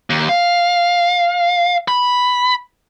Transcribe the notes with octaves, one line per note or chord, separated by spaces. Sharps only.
D#2
F5
B5